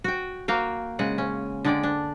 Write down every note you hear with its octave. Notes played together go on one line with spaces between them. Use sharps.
F#4 G5
A#3 F#4 F5 G5
C#3 G#3 F#5
C#4
D3 G#3 D5 G5
D4